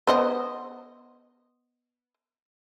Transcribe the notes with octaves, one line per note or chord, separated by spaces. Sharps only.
B3 C5 D#5